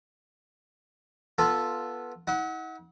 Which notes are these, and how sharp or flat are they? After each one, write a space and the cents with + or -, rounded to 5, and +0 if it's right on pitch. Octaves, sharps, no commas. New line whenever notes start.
B3 -15 F4 +0 A4 +0
E4 -45 F#5 +0